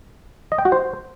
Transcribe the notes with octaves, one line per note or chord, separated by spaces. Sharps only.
D#5
G5
F#4
C5